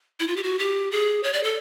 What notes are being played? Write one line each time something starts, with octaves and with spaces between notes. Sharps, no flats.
E4
F4
G4
F#4
G4
G#4
C#5
D5
A4